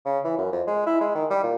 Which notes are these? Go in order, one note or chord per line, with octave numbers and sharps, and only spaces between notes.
C#3
E3
F#2
F2
G#3
E4
G#3
D#3
G3
A#2